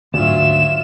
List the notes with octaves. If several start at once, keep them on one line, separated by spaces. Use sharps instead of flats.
D2 G#2 F#3 F4 E5 E7